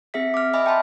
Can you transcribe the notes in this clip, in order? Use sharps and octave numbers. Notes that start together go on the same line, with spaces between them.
C4 G#4 E5 B6
D6 F6
D#5 E5 G#5 B5 D6 F6
G5 A5 B5 C6